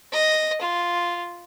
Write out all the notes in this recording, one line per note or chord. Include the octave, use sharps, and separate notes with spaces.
D#5
F4